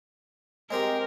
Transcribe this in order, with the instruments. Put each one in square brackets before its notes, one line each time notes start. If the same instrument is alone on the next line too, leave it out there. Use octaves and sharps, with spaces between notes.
[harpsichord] G#3 C4 G4 [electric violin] A#4